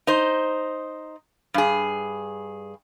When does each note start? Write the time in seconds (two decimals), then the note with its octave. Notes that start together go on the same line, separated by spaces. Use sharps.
0.07 D#4 C5
1.54 G2 G#4